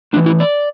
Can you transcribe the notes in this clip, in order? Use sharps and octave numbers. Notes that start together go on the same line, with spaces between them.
A2 E3 D4
E4
D5